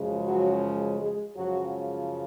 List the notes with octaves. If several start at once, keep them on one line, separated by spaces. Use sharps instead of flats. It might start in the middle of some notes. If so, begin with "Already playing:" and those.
Already playing: F#2 C#3 F3 G#3
F#3 F#4
G#3 G#4
F#2 C#3 F3 F#3 G#3 F#4